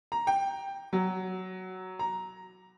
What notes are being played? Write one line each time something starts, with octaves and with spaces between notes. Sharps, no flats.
A#5
G5
F#3
A#5